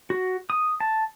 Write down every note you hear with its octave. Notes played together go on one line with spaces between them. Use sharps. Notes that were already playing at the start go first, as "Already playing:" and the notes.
F#4
D#6
A5